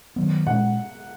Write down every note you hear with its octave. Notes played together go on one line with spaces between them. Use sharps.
D#3 F#3 B3
A#2 G#3 C#4 F#5